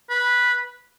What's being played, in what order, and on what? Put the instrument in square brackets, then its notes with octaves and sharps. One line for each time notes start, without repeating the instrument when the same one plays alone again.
[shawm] B4